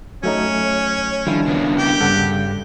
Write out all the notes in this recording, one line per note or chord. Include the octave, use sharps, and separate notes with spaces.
F#3 A3 C#4 D#4 C#5
D#3 F3 G3 D4 E4
C#3 A#3 B3
G4
G2 C#3 A4 F#5